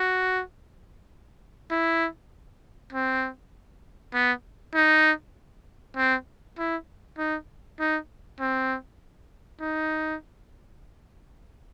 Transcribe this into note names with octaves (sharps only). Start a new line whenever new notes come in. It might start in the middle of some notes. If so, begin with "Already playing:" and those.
Already playing: F#4
E4
C4
B3
D#4
C4
E4
D#4
D#4
C4
D#4